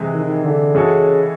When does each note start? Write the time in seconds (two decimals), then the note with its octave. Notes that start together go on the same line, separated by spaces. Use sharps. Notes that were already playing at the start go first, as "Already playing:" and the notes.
Already playing: C3 E3 G#3
0.13 D#3
0.44 D3
0.75 C#3 E3 G#3 C#4 F#4 A4